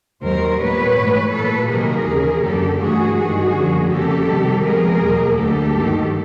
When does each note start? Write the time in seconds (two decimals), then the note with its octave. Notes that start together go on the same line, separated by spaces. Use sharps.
0.22 D#2 D#3 F#3 A#4 C5
0.59 A#2 G3 B3 B4 C#5
0.96 G#2 E3 A3
1.32 A#2 F#3 A#3 A4 B4
1.69 C3 D#3 F#3 A#3 G#4 A#4
2.07 D#2 C#3 E3
2.42 F#2 D3 F#3 A#3 G4 A4
2.79 G2 E3 A3 F#4 G#4
3.16 G2 D#3 F#3 A3 F#4 G#4
3.53 F#2 D3 F3 A#3
3.88 F2 C#3 F3 A#3 G4 A4
4.26 C3 D#3 G3
4.62 C3 F3 G#3 B3 G#4 A#4
4.99 E2 B2 F#3 A#3
5.35 D2 D3 F#3 G4 A4
5.73 G2 D#3 F#3 A#3